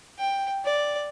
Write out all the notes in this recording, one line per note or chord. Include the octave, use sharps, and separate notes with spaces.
G5
D5